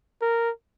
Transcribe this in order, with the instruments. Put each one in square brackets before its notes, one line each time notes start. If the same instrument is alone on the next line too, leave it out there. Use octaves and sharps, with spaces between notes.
[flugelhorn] A#4